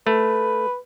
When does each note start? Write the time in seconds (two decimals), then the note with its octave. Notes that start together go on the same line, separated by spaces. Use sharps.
0.07 A3 B4